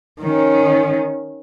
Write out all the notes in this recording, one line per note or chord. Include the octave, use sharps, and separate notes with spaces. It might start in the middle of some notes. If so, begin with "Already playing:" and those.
D#3 C#4